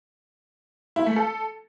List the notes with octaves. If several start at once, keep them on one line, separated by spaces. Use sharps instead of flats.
E4
A3
A4